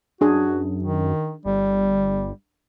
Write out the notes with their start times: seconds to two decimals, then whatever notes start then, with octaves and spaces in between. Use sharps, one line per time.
0.21 F#2 D4 F#4 G#4
0.83 D#3
1.45 G1 G3